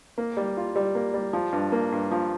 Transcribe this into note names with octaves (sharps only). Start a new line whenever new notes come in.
A#3
G3
F4
G3
A#3
G3
F3
G2
A#3
G2
F3